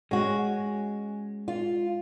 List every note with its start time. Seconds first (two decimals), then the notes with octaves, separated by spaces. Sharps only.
0.11 G#3 C#4 F#4
1.48 F4